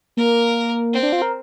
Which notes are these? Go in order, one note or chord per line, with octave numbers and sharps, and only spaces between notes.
A#3 A#4
C4
D4
F4
A#4